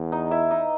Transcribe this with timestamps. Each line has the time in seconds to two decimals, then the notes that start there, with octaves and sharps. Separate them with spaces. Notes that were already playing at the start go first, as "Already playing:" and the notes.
Already playing: E2 B3
0.12 D#4 D#5
0.31 E4 E5
0.51 D#4 D#5